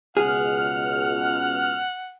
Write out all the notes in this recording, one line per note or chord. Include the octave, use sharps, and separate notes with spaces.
C#2 B2 G#4 F#5 F6